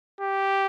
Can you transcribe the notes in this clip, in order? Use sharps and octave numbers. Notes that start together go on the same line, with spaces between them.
G4